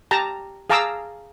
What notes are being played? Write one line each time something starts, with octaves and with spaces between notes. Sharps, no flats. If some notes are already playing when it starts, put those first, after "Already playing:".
G4 A5 A#5
G#4 F5 A5 A#5 D6 E6